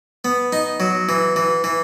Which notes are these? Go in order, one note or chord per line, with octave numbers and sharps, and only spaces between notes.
B3
D#4
F#3
E3
E3
E3